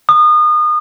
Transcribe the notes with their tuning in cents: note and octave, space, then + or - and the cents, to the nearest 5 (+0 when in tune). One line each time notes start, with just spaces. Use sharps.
D#6 -30